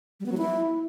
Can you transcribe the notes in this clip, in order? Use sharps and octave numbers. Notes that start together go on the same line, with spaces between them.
G3
B3
F#3
E4